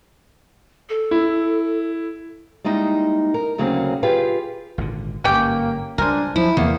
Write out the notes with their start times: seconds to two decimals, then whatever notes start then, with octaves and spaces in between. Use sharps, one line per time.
0.89 A4
1.11 E4
2.64 G3 G#3 A#3 D#4 E4
3.34 A#4
3.58 D2 C#3 F#3 A#3 C4 G#4
4.03 F4 G4 G#4 B4 F5 G5
4.78 G#1 A#2 D3
5.24 G1 G#2 A#3 C#4 G4 G5
5.98 C#2 G3 D4 A#4 C5 G#5
6.36 F3 F#3 E4
6.57 E2 C3 D#3 F3 A#3